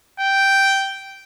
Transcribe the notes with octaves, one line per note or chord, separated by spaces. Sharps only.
G5